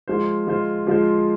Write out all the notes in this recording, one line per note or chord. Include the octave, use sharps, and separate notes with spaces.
F3 G#3 F4 C5
F3 G#3 F4 C5
F3 G#3 F4 C5